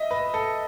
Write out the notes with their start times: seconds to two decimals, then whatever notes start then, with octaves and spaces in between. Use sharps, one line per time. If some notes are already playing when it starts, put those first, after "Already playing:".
Already playing: D#5 E5
0.11 B4
0.34 A4